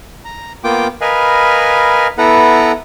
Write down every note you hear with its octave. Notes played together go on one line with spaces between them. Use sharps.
A#5
A#3 B3 F4 G5 D6
A#4 B4 D#5 F5 G#5 B5
B3 E4 A4 B4 F#5 A#5